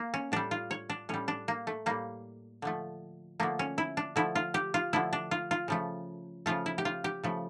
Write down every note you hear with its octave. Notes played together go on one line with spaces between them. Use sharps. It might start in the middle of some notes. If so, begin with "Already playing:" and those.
Already playing: A#3
C#4
A2 G3 D4
F4
C#5
D4
A2 G3 C#4
D4
A#3
A3
A2 G3 A#3
D3 F3 A3
D3 F3 A3 A#3
C#4
E4
D4
D3 F3 A3 E4
F4
G4
F4
D3 F3 A3 E4
D4
F4
F4
C#3 F3 A3
C#3 F3 A3 F4
E4
G4
F4
G4
C#3 F3 A3